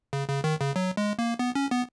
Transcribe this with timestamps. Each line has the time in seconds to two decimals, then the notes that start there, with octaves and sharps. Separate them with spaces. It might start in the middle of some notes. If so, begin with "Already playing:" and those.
0.13 C#3
0.29 C#3
0.44 D#3
0.61 C#3
0.76 F#3
0.97 G#3
1.19 A#3
1.39 B3
1.55 C#4
1.71 B3